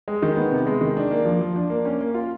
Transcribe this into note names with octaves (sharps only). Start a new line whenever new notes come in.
G#3
D#3
B3
C3
G#3
D#3
D4
A#3
F3
F3
D4
A#3
C#4
A#3
F4